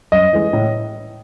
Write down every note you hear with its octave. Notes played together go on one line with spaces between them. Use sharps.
F#2 D#5
E3 G#3
A2